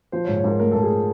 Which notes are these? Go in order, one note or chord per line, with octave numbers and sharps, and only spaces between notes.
F3 C5
C#5
G#2
C#5
G#2 A#4
A3 A#4
G#2 A4
G#4